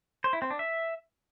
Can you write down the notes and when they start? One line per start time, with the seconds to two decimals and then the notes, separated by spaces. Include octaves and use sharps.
0.24 C5
0.33 E4
0.42 C4
0.51 D4
0.59 E5